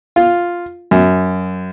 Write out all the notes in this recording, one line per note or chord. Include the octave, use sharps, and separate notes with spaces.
F4
F#2